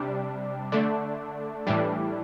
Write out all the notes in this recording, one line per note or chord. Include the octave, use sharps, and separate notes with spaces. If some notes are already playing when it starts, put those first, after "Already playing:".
Already playing: C3 G3 D4
D3 A3 D4
A2 E3 G3 D4